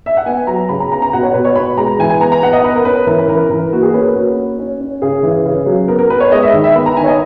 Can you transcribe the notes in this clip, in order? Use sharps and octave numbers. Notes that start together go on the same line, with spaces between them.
E5
F#5
B3 G#5
F#3 A#5
C#3 B5
A#5
B3 A#5
A#5
B2 F#5
C#5
B2 B4
C#5
B3 B5
G#3 A#5
E3 G#5
G#5
B3 A#5
A#5
B3 F#5
D#5
B3 B4
A#4
C#4 B4
E3 A#4
B4
E3 A#4
E3 A#4
A#3 F#4
G#4
C#4 B4
A#4
A#3 F#4
C#4
C#4
C#4
C#3 G#4
E3
C#3
F#3
B3 A#4
A#4
B3 B4
C#5
G#3 D#5
E5
D#3
E5
B3 B5
A#5
D#3 G#5
C#5
D#5